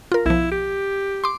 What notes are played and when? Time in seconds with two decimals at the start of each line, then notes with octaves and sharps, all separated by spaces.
0.12 F4 A#4
0.26 B1 F3 E4
0.51 G4
1.24 C6 D6